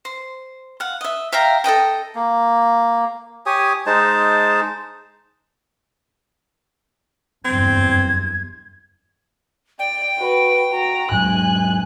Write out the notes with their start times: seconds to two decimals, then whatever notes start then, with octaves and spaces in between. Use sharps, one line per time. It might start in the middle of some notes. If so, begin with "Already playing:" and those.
0.05 C5
0.80 F5 F#5
1.01 D#5 E5
1.32 E5 F5 G5 A#5
1.64 A4 B4 D#5 G5
2.15 A#3
3.46 G4 C#5 G#5 D#6
3.86 G#3 D#4 C5 A5
7.45 F#1 E2 G2 C4 G#6
9.79 D5 G5
10.19 F#4 B4
10.71 F#4 A#5
11.12 G#2 F#3 G#3 G#5 F#6